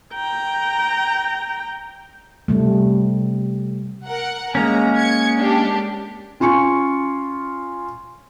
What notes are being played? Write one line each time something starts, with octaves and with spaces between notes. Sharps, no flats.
G5 A#5
C3 G3 A3
A#4 F#5
G#3 A#3 C#4 A#5
G#6 C#7
D4 G4
C#4 F4 G#5 C#6 C#7